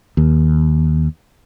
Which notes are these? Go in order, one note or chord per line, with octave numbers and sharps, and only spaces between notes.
D#2